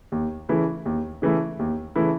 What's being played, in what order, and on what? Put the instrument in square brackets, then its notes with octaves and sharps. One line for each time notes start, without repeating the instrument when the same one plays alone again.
[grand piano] D#2
C#3 E3 A3 E4
D#2
C#3 E3 A3 E4
D#2
C#3 E3 A3 E4